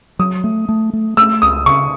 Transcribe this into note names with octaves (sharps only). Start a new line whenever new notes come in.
F#3 D#6
A3
A3
A3
A3 E6
C#2 D#6
C#3 C#6